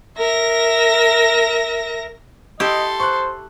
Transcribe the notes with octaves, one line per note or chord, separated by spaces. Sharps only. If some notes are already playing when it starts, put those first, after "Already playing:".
A#4 E5 A#6
E4 G4 A4 D#5 C6
C5 C#6 F#6